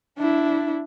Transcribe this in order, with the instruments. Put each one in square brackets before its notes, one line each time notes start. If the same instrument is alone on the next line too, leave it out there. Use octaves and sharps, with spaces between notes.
[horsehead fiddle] D4 E4